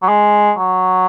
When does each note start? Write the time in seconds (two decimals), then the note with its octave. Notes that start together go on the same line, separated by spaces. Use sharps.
0.03 F#3
0.09 G#3
0.57 F#3